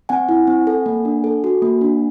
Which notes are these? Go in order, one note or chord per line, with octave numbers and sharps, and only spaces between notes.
C4 F#5 G#5
E4
C4
A4
A#3
D4
A4
F#4
A#3
D4